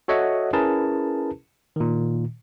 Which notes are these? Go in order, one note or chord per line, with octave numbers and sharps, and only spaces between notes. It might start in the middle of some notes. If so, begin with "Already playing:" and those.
F#4 A4 C#5 D#5 E5 F#5
C#4 E4 G#4 A#4 B4 A5
A#2 D#3